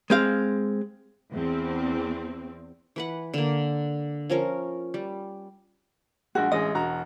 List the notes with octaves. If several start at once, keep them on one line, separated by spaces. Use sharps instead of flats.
G#3 C4 F5
E2 C4
E3 B4 F#5
D3 A#3
F3 C#4 A#4
G3
A#1 G#3 F#4
A1 G#3 D#5
E1 F#4 A#5